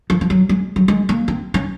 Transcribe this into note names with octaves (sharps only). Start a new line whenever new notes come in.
F3
F3
F#3
G#3
F#3
G#3
A#3
C4
C#4